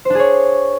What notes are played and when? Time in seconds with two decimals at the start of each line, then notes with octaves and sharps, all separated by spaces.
0.05 C5
0.10 D4
0.15 G#4
0.20 C#5